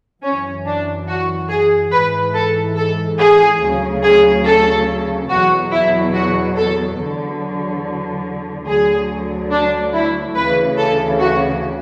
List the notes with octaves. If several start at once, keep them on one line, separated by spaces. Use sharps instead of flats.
F#2 E3 C#4
D4
F#4
G#4
G#2 E3 B4
A4
A4
G#4
D2 C#3 F#3
G#4
A4
E2 B2 F#3 F#4
E4
F#4
A4
E2 D3 F#3
D2 D3 F#3 G#4
D4
E4
D2 C#3 E3 B4
A4
F#4